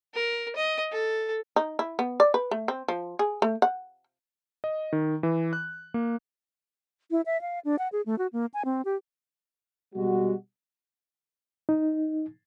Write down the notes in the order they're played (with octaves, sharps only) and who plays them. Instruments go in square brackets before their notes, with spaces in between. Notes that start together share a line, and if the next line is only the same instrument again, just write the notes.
[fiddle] A#4
D#5
A4
[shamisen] D#4
E4
B3
D5
B4
A3
C4
F3
G#4
A3
F#5
[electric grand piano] D#5
D#3
E3
F#6
A#3
[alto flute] E4
E5
F5
D4
F#5
G#4
A3
F#4
A#3
G#5
C4
G4
[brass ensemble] B2 G3 G#3 F#4
[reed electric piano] D#4